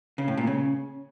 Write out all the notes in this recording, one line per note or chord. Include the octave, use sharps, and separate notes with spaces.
C#3
A2
A#2
C#3